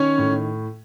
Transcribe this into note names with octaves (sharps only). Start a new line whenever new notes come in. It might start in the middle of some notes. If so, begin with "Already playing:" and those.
Already playing: D#3 C#4 C#5
A2